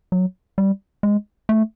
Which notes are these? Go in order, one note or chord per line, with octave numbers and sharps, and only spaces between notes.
F#3
G3
G#3
A3